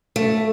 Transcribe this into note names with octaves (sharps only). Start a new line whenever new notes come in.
A3